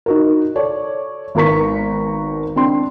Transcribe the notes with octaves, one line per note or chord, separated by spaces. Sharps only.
D#4 F#4 A#4
A4 C#5 D5
G#1 B3 A#4 A#5 C#6 B6
C4 D4 C6